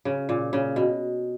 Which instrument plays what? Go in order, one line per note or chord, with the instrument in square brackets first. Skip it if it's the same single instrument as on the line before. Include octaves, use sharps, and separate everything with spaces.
[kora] C#3
A#2
C#3
B2